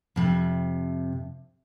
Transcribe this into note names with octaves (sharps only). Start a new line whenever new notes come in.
F2 C3